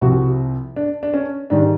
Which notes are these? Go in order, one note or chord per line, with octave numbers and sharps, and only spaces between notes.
C2 C3 F3 F#4
D4
D4
C#4
G#2 D#3 G3 D4